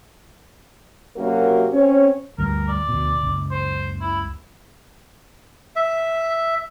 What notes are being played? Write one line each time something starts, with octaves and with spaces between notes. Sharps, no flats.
F#2 C3 A#3 F#4 A#4
C4 C#4 C#5
D2 G2 A#4
D5
D2 B2
F#1 C#2
C5
E4
E5